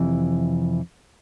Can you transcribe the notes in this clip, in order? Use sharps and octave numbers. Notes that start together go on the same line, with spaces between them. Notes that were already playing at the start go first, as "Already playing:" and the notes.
Already playing: F2 C3 E3